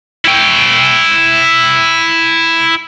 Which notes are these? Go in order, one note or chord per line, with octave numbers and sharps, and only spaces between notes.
E4 G5